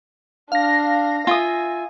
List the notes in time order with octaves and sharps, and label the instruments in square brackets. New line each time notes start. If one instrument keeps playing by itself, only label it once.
[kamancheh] D4 [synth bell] F5 A#6
[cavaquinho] F4 E5 D#6 [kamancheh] G#5